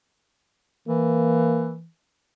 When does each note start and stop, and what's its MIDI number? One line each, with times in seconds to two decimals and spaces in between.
0.88 1.86 52
0.88 1.75 58